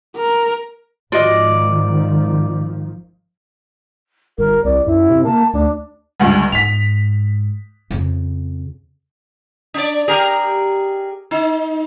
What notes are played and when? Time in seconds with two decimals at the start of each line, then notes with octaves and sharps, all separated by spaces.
0.16 A#4
1.12 G#1 D#3 F3 F4 F#4 D5 D#5
4.38 G1 A#4
4.65 C2 D5
4.87 F#2 E4
5.10 C3
5.25 A#3 A5
5.54 D2 D4
6.20 G1 C#2 G2
6.52 G#2 B6 F7
7.91 F2 C#3
9.74 D4 D5
10.08 G4 G#4 A#4
11.31 D#4